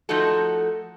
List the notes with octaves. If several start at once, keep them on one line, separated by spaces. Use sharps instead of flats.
F3 A3 D#4 F#4 A4